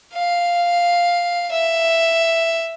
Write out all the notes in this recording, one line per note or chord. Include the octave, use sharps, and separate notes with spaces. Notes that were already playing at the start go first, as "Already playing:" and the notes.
F5
E5